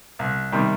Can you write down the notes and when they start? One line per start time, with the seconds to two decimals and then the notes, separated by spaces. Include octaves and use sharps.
0.19 C2
0.52 C3 D#3 G3